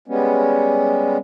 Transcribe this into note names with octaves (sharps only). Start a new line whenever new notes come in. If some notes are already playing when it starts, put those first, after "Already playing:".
G3 G#3 B3 C#4